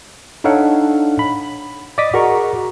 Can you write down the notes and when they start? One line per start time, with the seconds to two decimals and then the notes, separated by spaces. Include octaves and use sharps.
0.44 D4 D#4 A4 C#5 F5 F#5
1.19 B5
1.98 D5 D#5 D6 D#6 B6
2.14 F#4 G#4 A#4 A#5 C#6